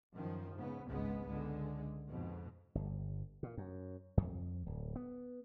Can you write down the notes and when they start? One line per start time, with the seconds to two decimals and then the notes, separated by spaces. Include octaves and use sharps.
0.12 F#2 D#3 F3
0.55 G#2 C#3 B3
0.86 G#1 C#2 C#3 G#3 B3
1.28 C#2 D3 G#3
2.07 F2 G#2 B2
2.75 G1
3.43 A#2
3.57 F#2
4.17 F2
4.66 D1
4.96 B3